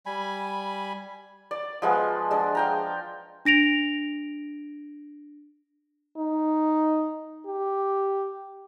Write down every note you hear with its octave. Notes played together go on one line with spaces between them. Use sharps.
G3 G#5 B5
D5
F3 G#3 B3
G#3 D4
F5 G5 A#5
D4 A#6 D7 F7
D#4
G4